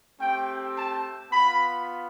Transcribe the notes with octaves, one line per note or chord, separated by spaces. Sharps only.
A3 C4 G4 G5
A5
B3 F4 B5